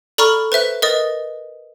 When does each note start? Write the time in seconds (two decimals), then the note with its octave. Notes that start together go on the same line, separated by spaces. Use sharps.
0.18 A4 D5 A#5 B5 C#6 F6
0.52 B4 C5 E5 F#6
0.82 A#4 B4 D#5 D#6 A6